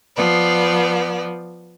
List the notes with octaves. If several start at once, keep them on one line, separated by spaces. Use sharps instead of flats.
F3 B3 D5